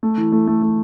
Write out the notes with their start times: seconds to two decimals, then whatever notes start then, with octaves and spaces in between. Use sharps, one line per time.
0.03 A3
0.18 E3
0.32 A3
0.47 A3
0.62 A3